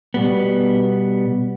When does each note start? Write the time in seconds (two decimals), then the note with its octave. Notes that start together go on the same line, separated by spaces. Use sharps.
0.14 B2 G3 B3